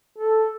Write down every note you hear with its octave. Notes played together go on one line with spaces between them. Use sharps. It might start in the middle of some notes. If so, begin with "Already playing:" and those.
A4